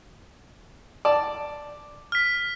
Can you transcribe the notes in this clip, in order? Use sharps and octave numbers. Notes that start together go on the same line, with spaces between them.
D5 A5
F6 B6